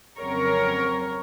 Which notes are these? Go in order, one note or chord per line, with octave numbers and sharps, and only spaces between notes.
F2 C#3 F#3 C4 A#4 C#5